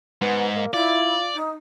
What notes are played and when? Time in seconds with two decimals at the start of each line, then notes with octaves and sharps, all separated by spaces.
0.22 G#2 B3
0.56 A#3
0.74 E4 F4 D5
1.35 D#4